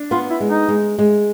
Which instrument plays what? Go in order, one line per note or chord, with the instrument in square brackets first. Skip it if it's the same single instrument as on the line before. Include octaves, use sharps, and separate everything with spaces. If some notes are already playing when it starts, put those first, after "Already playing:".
Already playing: [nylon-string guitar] D4
[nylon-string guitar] B3 [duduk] F4
[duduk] E4
[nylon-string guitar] G#3
[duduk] D#4
[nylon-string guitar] G#3
G#3